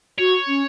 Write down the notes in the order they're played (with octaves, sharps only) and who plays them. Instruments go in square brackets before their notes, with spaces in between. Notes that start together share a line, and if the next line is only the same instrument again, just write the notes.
[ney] F#4 [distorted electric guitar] C#5
[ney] C#4